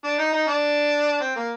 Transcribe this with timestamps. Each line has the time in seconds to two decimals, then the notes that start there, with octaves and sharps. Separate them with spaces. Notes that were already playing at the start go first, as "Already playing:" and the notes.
0.04 D4
0.19 D#4
0.33 D#4
0.47 D4
1.21 C4
1.36 A#3